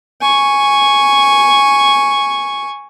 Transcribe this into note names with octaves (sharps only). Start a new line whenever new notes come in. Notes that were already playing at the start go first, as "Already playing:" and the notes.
G#5 C#6